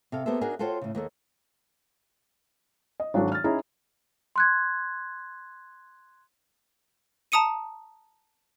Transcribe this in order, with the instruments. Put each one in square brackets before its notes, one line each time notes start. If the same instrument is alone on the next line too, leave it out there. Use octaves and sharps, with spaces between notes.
[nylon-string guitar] C3 A4 F5
A#3 B3 G4 A4 C5 E5
D4 D#4 F#4 G#4 A#4
F4 F#4 A4 C5 C#5 G5
A2 C#3
D#2 A#3 A4
[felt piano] D#5
G#1 F#3 D4 F#4 A4
F6 A6
C#4 D#4 E4 G#4 A#5
[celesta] C6 F#6 G#6
[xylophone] A5 A#5 D#6 C#7 D#7